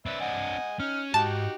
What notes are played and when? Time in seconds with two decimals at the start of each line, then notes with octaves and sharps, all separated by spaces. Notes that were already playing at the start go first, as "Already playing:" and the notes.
0.06 C4 D4 B4 E5
0.21 D#5 F#5 G#5
0.80 C#4 D#4 F6
1.14 G#2 D#4 F#4 G4 A5